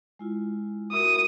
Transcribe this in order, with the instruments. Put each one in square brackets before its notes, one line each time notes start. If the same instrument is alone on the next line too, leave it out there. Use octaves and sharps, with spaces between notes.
[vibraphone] G#3 E4 F4
[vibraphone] F#4 A#4 E5 [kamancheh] D#6